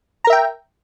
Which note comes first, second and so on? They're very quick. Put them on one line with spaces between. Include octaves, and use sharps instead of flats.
A#5 A#4 E5 G5